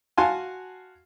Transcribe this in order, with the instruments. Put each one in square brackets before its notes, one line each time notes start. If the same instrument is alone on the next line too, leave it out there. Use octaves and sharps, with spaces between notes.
[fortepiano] F#4 F5 F#5 G#5 A5 C6